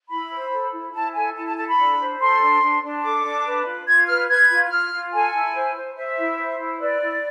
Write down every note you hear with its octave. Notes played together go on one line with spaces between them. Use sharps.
E4 B5
C5
A4
E4
E4 A5
A4 G#5
E4 A5
A5
A4 A5
B5
D4
C5
A4 C6
D4
D4
D4
A4 D6
D4
B4
F4
F4 G#6
B4 F6
B4 G#6
F4
F4 F6
F4
A4 G#5
E4
C5
C5
C5 E5
E4
C5
E4
B4 D5
E4